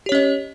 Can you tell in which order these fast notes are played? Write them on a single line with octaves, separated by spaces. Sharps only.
G4 C#5 C#4 D#5